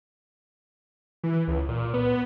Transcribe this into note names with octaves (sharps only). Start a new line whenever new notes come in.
E3
C#2
A#2
B3